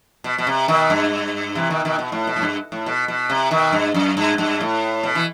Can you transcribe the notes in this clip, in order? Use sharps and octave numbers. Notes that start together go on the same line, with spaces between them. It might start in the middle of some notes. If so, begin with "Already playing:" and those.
B2
B2
C3
B2 D#3
G2
C3 E3
B2 D#3
B2 D#3
B2
A2
B2
A2
G2
A2
B2
B2
C3
B2 D#3
G2
F#2
G2
G2
A2
B2
E3